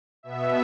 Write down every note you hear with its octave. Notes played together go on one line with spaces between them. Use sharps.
B2 B3 E5